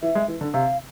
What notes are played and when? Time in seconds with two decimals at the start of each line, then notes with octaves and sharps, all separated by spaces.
0.02 E3 E5
0.15 G#3
0.28 E3
0.41 D3
0.54 C3 F5